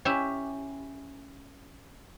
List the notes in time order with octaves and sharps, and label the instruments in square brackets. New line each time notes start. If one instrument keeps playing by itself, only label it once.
[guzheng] C#4 E4 G4 E5